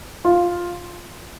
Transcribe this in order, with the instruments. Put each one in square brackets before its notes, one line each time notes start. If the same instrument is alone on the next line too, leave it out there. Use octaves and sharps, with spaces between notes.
[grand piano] F4